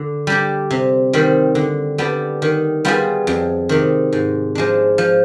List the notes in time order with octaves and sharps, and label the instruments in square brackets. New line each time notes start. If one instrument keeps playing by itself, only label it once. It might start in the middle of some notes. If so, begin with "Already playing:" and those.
Already playing: [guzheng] D3
G3 D4 G4
C3
D#3 G3 C4
D3
G3 B3 D4 G4
D#3
G3 B3 F4 G#4
F2
C3 D#3
G#2
F3 G#3 D4
F3